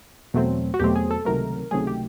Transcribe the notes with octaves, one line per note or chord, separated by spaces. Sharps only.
E2 B2 F#3 A3 C4
F#4
E2 B2 F#3 A3 C4 G4
G#4
A4
C#2 C3 D#3 F#3 A3 A#4
C#2 C3 D#3 F#3 A3 G#4
G4